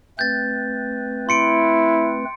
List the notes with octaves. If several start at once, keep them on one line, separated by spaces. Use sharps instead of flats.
A3 C4 B4 G6 A6
E4 C6 C#7 D7